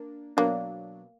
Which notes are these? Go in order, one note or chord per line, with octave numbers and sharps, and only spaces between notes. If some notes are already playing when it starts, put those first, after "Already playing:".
Already playing: A#3 D4
B2 F#3 A#3 D4